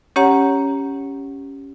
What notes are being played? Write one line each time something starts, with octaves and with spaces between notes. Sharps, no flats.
C#4 G4 C#5 F#5 A#5